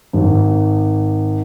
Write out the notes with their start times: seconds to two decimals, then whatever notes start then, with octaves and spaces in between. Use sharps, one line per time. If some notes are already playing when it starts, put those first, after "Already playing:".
0.13 G#1